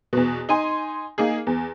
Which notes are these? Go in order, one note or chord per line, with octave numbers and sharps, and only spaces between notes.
E2 B2
D#4 G#5 C6
A#3 D#4 G#4
E2